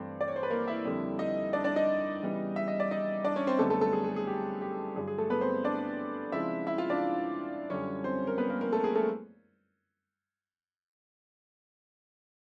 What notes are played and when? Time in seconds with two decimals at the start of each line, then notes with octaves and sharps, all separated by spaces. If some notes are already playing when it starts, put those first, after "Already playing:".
Already playing: G2 E3 A3 C4
0.21 D5
0.28 C#5
0.36 C5
0.43 B4
0.50 A#3 A#4
0.67 E4 E5
0.85 F2 D3 G3
1.19 D#4 D#5
1.53 D4 D5
1.64 D4 D5
1.76 D#4 D#5
2.22 C#3 E3 G3 B3
2.56 E5
2.68 D#5
2.80 D5
2.91 D#4 D#5
3.24 D4 D5
3.36 C#4 C#5
3.47 C4 C5
3.59 F#2 D3 G3 A3 B3 A4
3.70 A3 A4
3.81 A3 A4
3.93 G#4
4.04 G#4
4.16 G#4
4.27 G4
4.61 G4
4.96 G2 D3 F#3 G#4
5.07 G#4
5.18 A3 A4
5.30 B3 B4
5.41 C4 C5
5.64 D4 D5
6.32 C#3 F3 G#3 C4 E4 E5
6.67 E4 E5
6.78 F4 F5
6.90 D4 D5
7.70 F#2 D3 G3 C#4 C#5
8.04 C4 C5
8.27 A#4
8.38 B3 B4
8.49 A#3 A#4
8.61 A#3 A#4
8.72 A3 A4
8.84 G#4
8.95 A3 A4